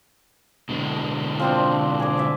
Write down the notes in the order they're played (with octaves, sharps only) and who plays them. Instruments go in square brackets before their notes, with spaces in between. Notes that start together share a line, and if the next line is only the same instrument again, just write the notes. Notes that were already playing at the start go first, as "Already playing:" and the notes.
[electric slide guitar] B2 D3 G#3
[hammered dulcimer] F3 C4 D4
G#4 D6
D5 E5